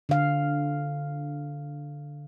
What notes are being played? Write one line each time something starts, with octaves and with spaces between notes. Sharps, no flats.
D3 F5